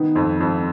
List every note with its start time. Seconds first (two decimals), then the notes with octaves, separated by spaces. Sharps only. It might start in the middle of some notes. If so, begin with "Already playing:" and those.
Already playing: D#3 B3
0.16 F2
0.40 F2